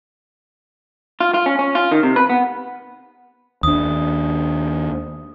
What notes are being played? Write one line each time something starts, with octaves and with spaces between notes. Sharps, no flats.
F4
F4
C#4
C#4
F4
D#3
C3
B4
B3
D#2 D4 D#6